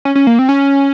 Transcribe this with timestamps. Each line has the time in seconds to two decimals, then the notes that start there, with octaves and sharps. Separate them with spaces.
0.05 C#4
0.15 C#4
0.27 A#3
0.39 C4
0.49 C#4